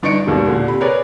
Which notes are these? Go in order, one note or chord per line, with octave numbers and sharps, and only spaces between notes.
G1 D4 D#4 C#6 C#7 D7
G#1 D#2 B2 G#3
A#2 D3
C3 B5
G#4 A#4 B4 C#5 D5